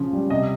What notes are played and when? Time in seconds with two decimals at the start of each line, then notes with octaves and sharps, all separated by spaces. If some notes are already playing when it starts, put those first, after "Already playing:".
Already playing: C#3 F3 F4
0.13 G3
0.30 C3 D#5